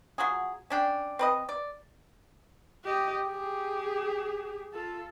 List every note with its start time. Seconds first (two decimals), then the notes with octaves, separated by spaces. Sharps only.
0.18 F#3 F4 F#4 G#4
0.70 C#4 D4 G5
1.19 C4 B4 D#5
1.49 D5
2.85 G4 D#5
3.27 G4 G#4
4.73 F4 A4